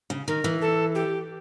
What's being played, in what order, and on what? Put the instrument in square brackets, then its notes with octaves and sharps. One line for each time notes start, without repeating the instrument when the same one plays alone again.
[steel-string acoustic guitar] C#3
[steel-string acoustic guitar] D#3 [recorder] A#4
[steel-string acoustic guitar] E3
[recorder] A4
G4